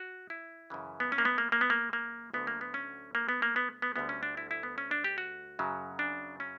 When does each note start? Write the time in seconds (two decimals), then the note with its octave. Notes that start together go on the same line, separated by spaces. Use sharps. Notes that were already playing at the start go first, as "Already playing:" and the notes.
Already playing: F#4
0.30 E4
0.70 F#2 C#3 E3
1.00 B3
1.12 C#4
1.18 A#3
1.25 B3
1.38 A#3
1.52 A#3
1.61 B3
1.70 A#3
1.93 A#3
2.34 D2 D3 F#3 B3
2.47 A#3
2.61 B3
2.74 C#4
3.15 A#3
3.29 B3
3.42 A#3
3.56 B3
3.82 B3
3.96 D2 D3 G3 B3
4.09 C#4
4.23 D4
4.37 E4
4.51 E4
4.63 B3
4.78 C#4
4.91 D4
5.04 G4
5.18 F#4
5.59 F#2 C#3 F#3
5.99 D4
6.40 C#4